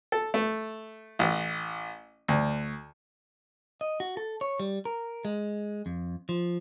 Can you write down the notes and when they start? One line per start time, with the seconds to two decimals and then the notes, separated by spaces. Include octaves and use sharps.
0.12 A4
0.34 A3
1.19 A1
2.28 D2
3.81 D#5
4.00 F#4
4.17 A4
4.41 C#5
4.60 G3
4.85 A#4
5.25 G#3
5.86 F2
6.29 F3